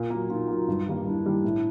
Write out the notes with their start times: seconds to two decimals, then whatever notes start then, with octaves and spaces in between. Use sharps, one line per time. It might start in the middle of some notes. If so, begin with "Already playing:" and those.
Already playing: A#2
0.10 F#3 A#3
0.29 A#2 D#4 F4
0.48 F#3 A#3
0.68 G2
0.87 D#3 G3 A#3
1.06 G2 D4 E4
1.25 D#3 G3 A#3
1.44 A2